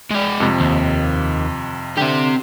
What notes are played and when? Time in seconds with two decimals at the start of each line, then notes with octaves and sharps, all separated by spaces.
0.11 G#3 D5
0.40 F2 C3
0.60 D#2
1.98 D3 C4 G4